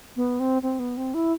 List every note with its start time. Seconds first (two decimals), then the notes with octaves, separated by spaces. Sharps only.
0.16 B3
0.40 C4
0.62 C4
0.79 B3
0.97 C4
1.14 E4